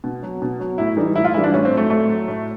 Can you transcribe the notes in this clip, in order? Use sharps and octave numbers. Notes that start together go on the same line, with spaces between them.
B2
F#3
B2
F#3
A2 E4
E3 G3 D#4
A2 E4
F4
E3 G3 E4
D4
A2 C#4
C4
F#3
A3
A2 A3
F#3
A2